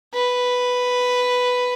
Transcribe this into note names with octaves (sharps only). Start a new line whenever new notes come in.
B4